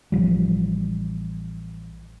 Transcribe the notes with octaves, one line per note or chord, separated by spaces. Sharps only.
A1 F3 G3